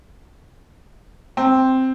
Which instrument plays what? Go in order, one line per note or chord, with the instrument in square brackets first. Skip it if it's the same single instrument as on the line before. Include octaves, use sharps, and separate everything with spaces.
[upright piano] C4